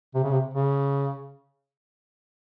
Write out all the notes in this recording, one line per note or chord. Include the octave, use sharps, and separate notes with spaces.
C3
C#3
C3
C#3